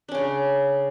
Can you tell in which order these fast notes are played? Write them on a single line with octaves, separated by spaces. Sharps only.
D4 C#4 C#3